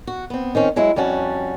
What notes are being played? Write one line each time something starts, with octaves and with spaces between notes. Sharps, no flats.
F#4
B3 C4
D#3 C4 C#4
F#3 G#3 E4
F2 G3 C#4 F#4 A5